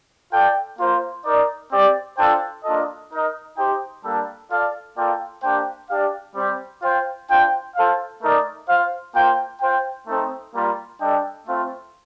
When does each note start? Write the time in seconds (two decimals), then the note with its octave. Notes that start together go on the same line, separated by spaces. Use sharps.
0.33 F4 A4 D5 G5
0.79 A#3 F4 C5
1.25 D#4 A#4 D5
1.72 C4 G4 D5
2.18 D4 F4 A4 C5 G5
2.65 A#3 D4 F4 A4 D#5
3.11 D#4 A#4 D#5
3.57 D#4 G4 C5 G5
4.04 G3 A#3 D4 A4
4.51 F4 A4 D5 F5
4.97 A#3 F4 A4 D5 G5
5.43 A#3 D4 G4 C5 G5
5.90 D4 G4 D5 F5
6.36 G3 C4 G4
6.82 F4 C5 G5
7.29 D4 F4 C5 G5
7.76 F4 A4 C5 F5
8.22 A3 D#4 A#4 D5
8.68 F4 C5 F5
9.15 A#3 F4 C5 G5
9.61 F4 C5 G5
10.07 A3 C4 D#4 A4
10.54 G3 A#3 F4 A#4
11.00 G3 D4 A4 D#5 G5
11.47 A3 C4 F4